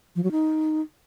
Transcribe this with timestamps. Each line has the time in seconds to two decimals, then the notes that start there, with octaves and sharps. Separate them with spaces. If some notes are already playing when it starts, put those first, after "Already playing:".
0.16 F3
0.24 F#3
0.31 D#4